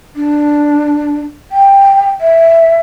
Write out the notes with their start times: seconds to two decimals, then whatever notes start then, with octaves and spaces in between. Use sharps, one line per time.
0.16 D4
1.52 G5
2.21 E5